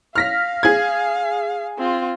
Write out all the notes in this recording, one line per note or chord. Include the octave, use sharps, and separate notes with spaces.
F5 F6 A#6 B6
G#4 G#6
C4 F4